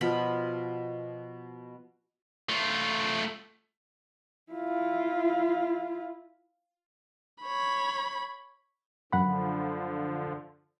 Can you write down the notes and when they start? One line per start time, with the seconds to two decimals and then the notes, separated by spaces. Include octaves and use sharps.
0.01 B2 F3 B5
2.49 A3 F4
4.52 E4 F4
7.43 C#5 B5
9.13 F#2 D3 F3 F#5 B5